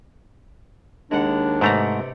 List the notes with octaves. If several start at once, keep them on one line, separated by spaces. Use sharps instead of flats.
D#2 G#3 D4 F#5
G#2 C3 A3 B3 A#5 D6